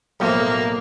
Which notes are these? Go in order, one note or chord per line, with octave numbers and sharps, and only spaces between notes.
B1 A2 F3 A#3